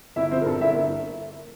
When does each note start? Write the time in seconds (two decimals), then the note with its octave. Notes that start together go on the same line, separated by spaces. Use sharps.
0.16 G1 E4 E5
0.31 F3 C4 C5
0.41 A#4
0.46 G2 A4
0.61 G1 E4 E5
0.76 A#3